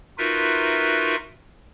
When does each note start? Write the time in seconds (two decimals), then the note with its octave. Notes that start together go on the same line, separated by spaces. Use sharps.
0.18 D#4 F4 F#4 A#4 B4 E5